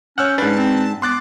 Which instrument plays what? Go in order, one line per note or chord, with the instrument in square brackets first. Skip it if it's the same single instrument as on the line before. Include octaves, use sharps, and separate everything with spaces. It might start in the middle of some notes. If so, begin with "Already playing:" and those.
[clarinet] C#4 [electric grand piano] C#5 E6 F6 [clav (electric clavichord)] F#5 [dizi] G6
[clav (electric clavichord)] G#2 D4 [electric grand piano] B4 [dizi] A5
[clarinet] C4
[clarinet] B3 [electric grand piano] C6 F#6 A6 [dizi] D6